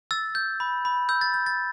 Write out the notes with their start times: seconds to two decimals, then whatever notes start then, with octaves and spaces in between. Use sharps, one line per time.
0.11 E6 A6
0.35 G6
0.60 B5
0.85 B5
1.09 E6 G6
1.21 A6
1.34 G6
1.46 A6